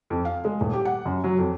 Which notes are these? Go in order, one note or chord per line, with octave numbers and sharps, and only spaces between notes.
F2
F5
G#3
D#1
G4
F#5
F#2
F#3
F2